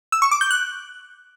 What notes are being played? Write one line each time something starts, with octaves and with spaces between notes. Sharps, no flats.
E6
C#6
D6
G6
F#6